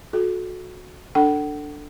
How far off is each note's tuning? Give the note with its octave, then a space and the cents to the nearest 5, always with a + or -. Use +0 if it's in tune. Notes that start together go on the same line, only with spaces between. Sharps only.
F#4 -25 A4 -30
D4 +0 A4 +15 F#5 +40